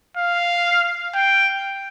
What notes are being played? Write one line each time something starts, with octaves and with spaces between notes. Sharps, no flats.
F5
G5